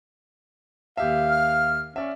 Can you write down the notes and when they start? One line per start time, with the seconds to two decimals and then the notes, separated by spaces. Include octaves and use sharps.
0.97 D#2 G4 E5 F5
1.29 F6
1.96 C#4 D5 E5